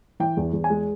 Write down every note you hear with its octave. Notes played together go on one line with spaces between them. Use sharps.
E3 G5
E2
E2
G#5
G#3